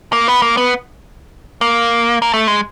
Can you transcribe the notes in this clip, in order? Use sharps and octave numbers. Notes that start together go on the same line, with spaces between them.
A#3
B3
A#3
B3
A#3
A#3
A3
G#3